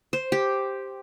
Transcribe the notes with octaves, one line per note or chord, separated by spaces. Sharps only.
C5
G4